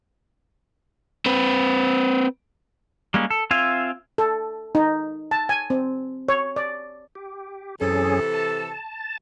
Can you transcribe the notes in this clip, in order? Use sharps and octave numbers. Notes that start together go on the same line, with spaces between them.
C4 B4
G3 G#3 A#3 C#4
A4
C4 F4 E5 F5 G#5
A4
D#4
A5
G#5
C4
C#5
D5
G4
F#2 C3 E3 C#4 G#4 A4
A5